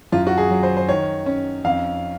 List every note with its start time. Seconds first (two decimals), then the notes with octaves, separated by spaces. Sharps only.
0.12 F#2 F4
0.27 F#4
0.38 G#4
0.51 F#3
0.63 C5
0.77 C5
0.88 D#3 C#5
1.26 C#4
1.64 F2 F5